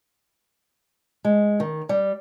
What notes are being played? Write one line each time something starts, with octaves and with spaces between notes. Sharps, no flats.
G#3
D#3
G3